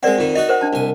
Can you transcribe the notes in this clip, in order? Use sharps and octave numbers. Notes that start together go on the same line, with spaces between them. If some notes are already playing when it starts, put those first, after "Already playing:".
G#3 C4 A#4 D5 F#5
F2 D#3
D#4 F#4 D#5
A#4 C5 F#5
D4 A5
C2 G#5